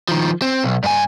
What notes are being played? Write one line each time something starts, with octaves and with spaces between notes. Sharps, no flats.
D#3 F3
C4
B1
G2 G#5